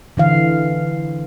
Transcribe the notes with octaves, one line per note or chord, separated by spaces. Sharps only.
D3 E3 F5